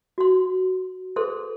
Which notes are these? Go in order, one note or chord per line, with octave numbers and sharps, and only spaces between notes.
F#4 C6
G#4 A4 B4 C5 C6